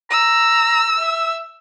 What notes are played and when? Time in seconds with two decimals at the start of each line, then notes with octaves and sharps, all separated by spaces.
0.10 A#5 E6
1.00 E5